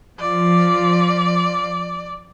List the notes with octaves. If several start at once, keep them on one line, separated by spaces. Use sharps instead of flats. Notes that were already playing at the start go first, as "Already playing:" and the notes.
F3 F4 D5